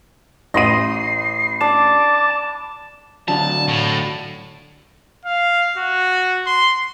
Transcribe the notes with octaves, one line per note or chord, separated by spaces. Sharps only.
A1 D#5 B5 C6 D#6 C7 D#7
D4 D5 A5 D6
D3 F#3 A5
A2
F5
F#4
C6